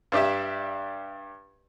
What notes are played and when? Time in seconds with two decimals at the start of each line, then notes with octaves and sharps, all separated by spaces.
0.12 G2 D4 G4 E5